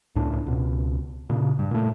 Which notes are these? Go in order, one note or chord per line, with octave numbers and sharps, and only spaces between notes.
C#2 A2 D4
C#2 B2
A#2 C#3
G2
A#2 A3